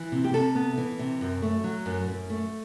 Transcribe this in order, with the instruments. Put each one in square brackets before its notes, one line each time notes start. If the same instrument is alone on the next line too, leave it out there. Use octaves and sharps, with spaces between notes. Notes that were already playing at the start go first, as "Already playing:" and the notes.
Already playing: [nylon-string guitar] E3
C3
G4
C3 A4
B3
E3
C3
F#2
A3
F#3
F#2
F#2
A3